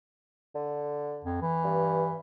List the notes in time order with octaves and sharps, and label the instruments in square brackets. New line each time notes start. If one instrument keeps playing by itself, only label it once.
[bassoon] D3
[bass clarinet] F2
E3
[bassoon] G2